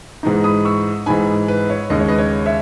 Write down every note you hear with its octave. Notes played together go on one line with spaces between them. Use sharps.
G#2 E3 G#3 D#4
B5 D#6
C#6 E6
G#2 E3 G#3 D#4 G#5 B5
B4
C#5
D#2 C#3 G#3 D#5
C#5
B4 D#5
C#5
C#5 E5